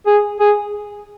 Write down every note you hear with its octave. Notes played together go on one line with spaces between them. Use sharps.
G#4
G#4